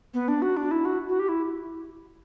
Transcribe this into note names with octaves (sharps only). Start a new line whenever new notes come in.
B3
D4
F#4
D4
E4
F#4
F#4
G4
E4